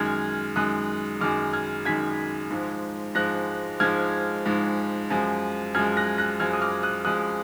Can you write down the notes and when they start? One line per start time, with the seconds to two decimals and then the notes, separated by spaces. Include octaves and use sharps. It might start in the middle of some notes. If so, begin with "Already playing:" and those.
Already playing: F#2 D#3 G#3 F6 G#6
0.56 F#2 D#3 G#3 D#6 F#6
1.21 F#2 D#3 G#3 D6 F6
1.53 F6 G#6
1.85 F#2 D#3 G#3 G#6 B6
2.51 G#2 F3 G#3
3.15 G#2 F3 G#3 F#6 A#6
3.80 G#2 F3 G#3 F6 G#6
4.46 G#2 F3 G#3
5.10 F#2 F3 G#3
5.74 F#2 F3 G#3 F6 G#6
5.97 F#6 A#6
6.18 F#6 A#6
6.40 F#2 F3 G#3 F6 G#6
6.53 D#6
6.61 D6 F6
6.83 D#6 F#6
7.05 F#2 F3 G#3 D#6 F#6